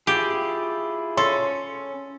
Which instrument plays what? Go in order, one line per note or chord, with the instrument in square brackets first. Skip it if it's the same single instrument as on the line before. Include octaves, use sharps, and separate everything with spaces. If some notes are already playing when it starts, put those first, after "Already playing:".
[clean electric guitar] E4 F4 G#4 [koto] G4
[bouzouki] C#4 [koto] A4 [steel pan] C6